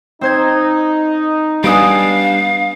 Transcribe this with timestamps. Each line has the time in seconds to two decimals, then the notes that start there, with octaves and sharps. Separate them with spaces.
0.21 C4 D#4 C5 G#6
1.64 G3 B3 D4 F5 G#5 D#6 D7